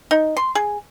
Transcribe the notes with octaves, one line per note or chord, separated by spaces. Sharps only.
D#4
C6
G#4